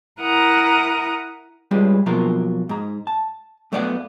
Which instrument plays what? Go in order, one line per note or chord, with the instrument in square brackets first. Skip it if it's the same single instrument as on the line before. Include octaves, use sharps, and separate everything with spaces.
[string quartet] E4 A#4 F#5 A#5 D#6
[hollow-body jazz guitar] G3 G#3 C#4 F4 B4
B2 F3 F#3 A#3 F4 A#4
G#2 A#5
A5
F#2 A3 B3 D5 F5 F#5